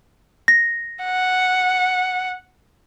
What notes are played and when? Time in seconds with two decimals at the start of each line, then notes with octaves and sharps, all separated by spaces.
0.48 A#6
1.05 F#5